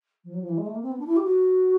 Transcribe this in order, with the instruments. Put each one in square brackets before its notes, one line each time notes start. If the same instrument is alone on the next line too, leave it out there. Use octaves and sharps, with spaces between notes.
[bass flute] F3
F#3
F3
E3
G#3
A3
A#3
C4
B3
D4
E4
G4
F#4